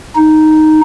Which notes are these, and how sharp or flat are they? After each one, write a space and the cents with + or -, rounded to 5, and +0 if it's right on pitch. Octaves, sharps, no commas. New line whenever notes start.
D#4 +0